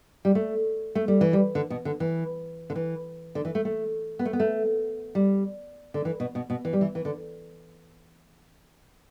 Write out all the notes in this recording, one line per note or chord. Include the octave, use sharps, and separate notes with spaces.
G3
A3
A3
G3
E3
G3
D3
B2
D3
E3
D3
E3
D3
E3
A3
A3
B3
A3
B3
A3
G3
D3
E3
B2
B2
B2
E3
G3
E3
E3
D3